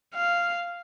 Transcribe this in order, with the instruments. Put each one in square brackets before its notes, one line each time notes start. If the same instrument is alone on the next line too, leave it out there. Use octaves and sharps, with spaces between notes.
[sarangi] F5